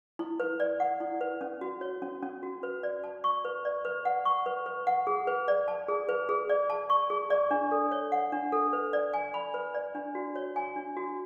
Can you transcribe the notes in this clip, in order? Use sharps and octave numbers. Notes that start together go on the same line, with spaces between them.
E4
B4
D5
F#5
E4
B4
C#4
F#4
C#5
C#4
C#4
F#4
B4
D5
A5
C#6
B4
D5
B4
F#5
C#6
B4
B4
F#5
G#4
B4
D5
A5
G#4
B4
G#4
D5
A5
C#6
G#4
D5
D4
A4
C#5
F#5
D4
A4
B4
D5
G#5
B5
B4
D5
D4
F#4
C#5
G#5
D4
F#4